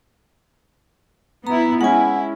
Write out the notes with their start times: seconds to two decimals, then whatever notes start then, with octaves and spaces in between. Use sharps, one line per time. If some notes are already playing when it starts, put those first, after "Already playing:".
1.47 B3 E4 A#5
1.81 G#3 C#4 E4 F#5 G#5